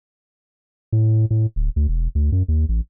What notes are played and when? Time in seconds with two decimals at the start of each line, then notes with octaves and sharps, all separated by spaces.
0.93 A2
1.31 A2
1.56 D1
1.76 D2
1.88 E1
2.15 D2
2.32 F#2
2.48 D#2
2.69 A1